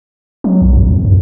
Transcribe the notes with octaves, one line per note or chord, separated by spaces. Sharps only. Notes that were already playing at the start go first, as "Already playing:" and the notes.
F#3
B1
E2
F2
F#2